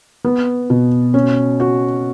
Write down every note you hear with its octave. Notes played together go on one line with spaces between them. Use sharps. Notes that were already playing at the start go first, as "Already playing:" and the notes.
B3
B2
C#4
F#4